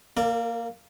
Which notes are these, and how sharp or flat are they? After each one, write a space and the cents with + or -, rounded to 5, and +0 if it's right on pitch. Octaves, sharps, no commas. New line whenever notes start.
A#3 +0 A#4 -40 D5 +0